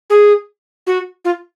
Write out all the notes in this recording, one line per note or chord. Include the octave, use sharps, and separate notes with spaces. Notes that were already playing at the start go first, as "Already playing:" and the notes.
G#4
F#4
F4